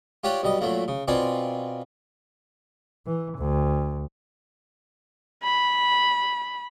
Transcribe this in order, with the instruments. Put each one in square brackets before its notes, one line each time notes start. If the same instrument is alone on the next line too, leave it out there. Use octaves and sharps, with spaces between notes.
[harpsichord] F4 G4 C#5 D5 F#5
B1 G3 D#5
A#2 F#3 A3 A#3
C#3
B2 C4 F4 D5 G#5 C6
[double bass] E3
D2
[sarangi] B5